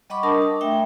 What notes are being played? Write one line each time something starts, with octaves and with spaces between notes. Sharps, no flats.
G3 D#5 F#5 B5 C#6 D6
D4 A#4 A5 D#6
A5
A3 E5 G5